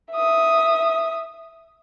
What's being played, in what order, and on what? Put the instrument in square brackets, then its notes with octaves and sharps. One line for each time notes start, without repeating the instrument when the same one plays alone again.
[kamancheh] E5 D#6